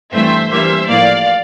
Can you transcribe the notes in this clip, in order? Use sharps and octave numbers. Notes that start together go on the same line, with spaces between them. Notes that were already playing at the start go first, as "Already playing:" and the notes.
G2 E3 A3 C4 C5 E5
G2 E3 G3 A#3 C5 E5
A2 F3 A#3 D5 F5